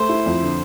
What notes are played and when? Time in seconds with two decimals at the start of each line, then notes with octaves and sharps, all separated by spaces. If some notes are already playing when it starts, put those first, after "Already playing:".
Already playing: A3 C5
0.09 E4
0.26 F2
0.42 D3